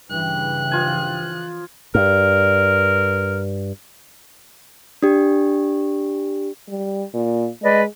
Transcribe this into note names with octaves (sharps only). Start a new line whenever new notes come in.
G2 C#3 E3 G5 F#6
F3 F4 G#5
G2 A#4
D4 G4
G3
A#2
G#3 B4 D5 D#5